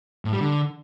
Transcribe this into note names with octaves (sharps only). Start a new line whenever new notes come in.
A2
G3
D3